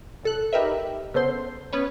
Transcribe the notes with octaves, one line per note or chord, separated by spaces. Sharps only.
C2 A4 F#6
D#4 G4 A#4 B4 E5
C#3 B3 A4 C5 C6
B3 C#4 B4 C#5